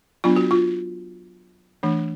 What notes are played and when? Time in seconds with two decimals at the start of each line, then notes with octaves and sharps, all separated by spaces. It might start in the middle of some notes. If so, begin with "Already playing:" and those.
0.24 F#3 B3 D4 F4
0.36 F#4
0.51 F4
1.83 E3 A3 D4